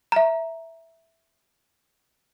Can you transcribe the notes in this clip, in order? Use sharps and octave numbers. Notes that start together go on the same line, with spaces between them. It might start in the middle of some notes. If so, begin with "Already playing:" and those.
E5 A#5